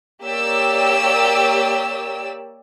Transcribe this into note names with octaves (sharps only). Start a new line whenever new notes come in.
A#3 G4 C#5 D5 E6